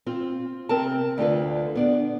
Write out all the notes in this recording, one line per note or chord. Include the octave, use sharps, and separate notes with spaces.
C4 F4
C3 C4 A#4 A5
D2 D3 F4 B4
B3 D4 D5